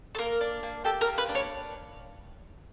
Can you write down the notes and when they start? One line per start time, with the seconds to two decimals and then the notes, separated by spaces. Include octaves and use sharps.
0.15 A4
0.18 A#3 A#4
0.41 D4
0.63 A#3
0.84 G4 A4
1.01 A#4
1.07 A#3
1.18 B4
1.29 D4
1.35 C#5